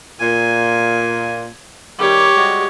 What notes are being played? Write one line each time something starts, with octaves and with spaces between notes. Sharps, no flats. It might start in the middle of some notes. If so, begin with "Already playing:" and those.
A#2 G#5
D#3 G3 G4 C#5
G3 G#3 F#4